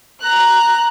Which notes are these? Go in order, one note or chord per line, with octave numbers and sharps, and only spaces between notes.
A#5 F#6